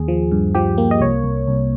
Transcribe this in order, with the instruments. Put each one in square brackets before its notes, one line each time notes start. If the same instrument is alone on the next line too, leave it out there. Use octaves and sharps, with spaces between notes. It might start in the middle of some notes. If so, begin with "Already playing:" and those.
Already playing: [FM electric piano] D#2 G#4
F3
G2
F3 G4
A#3
D#5
C2 C#5
C2
C2